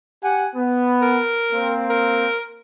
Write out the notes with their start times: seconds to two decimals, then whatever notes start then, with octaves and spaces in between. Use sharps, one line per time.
0.22 G4 F#5 G#5
0.55 B3
1.02 A#4
1.52 A#3 C4
1.90 A#4